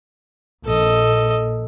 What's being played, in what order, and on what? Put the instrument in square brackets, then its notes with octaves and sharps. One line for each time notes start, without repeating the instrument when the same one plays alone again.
[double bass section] A#1 [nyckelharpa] A4 D#5